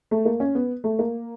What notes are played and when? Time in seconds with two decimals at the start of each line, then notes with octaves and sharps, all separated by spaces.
0.11 A3
0.25 A#3
0.40 C#4
0.55 B3
0.84 A3
0.99 A#3